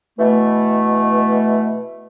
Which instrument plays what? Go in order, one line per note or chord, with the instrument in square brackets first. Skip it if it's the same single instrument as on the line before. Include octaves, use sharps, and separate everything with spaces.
[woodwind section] B2 E3 A3